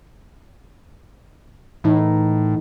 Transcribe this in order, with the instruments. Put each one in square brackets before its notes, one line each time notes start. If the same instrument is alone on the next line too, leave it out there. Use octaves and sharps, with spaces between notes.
[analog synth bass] A2 [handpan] E3 D#4